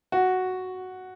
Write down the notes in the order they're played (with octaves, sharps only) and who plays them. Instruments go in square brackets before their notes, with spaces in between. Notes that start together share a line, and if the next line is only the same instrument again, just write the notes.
[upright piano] F#4